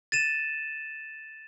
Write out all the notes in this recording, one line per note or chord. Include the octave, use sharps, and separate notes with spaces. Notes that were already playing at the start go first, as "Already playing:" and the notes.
A6 D#7 E7